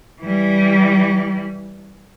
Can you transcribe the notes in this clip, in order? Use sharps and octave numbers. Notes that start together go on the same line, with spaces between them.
E3 G3